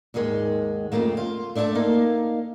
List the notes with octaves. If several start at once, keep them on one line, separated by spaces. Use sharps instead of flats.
D#2 G#2 D#3 G#3
F2 A2 C#3 A3 A#3
F4
A3 D4 E4 A4 E5 A5
A#3 D#4 F5